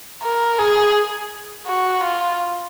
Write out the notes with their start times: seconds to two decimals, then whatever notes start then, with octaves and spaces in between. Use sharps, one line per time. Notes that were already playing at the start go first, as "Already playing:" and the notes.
0.23 A#4
0.58 G#4
1.67 F#4
2.04 F4